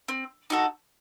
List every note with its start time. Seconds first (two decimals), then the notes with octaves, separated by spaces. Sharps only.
0.08 C4
0.50 D#4 F#4 A4